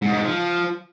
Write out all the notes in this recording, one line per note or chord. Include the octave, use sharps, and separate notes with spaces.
G#2
G#2
F3